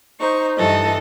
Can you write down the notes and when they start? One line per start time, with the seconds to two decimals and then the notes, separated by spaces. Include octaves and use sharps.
0.20 D#4 C5 C#6
0.56 G2 E3 A4 D#5